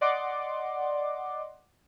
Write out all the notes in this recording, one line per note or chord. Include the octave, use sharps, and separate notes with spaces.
D5 D#5 F#5 C6 D6